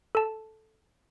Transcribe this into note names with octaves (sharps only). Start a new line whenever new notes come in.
A4 A5